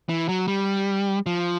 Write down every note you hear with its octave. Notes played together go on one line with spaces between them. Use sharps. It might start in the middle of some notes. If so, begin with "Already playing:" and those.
E3
F#3
G3
F3